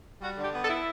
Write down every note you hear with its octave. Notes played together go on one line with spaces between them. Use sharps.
G3 F#4
D3
G4
B3
A4
E4